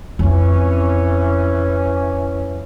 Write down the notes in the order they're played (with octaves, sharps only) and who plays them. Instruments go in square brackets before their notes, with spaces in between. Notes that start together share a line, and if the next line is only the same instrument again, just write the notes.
[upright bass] F2 C4 [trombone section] E3 C#4